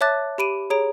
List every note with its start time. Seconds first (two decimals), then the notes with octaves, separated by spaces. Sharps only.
0.01 C#5 E5 A5 D6 F#6 A6
0.38 G4 B5 D7 D#7
0.70 G#4 C#5 A#5 D7